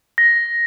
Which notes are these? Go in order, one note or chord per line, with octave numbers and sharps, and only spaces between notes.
A#6